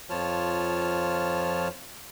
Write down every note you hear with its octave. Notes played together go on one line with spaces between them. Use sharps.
F2 F3 F4 C#5 A5 F6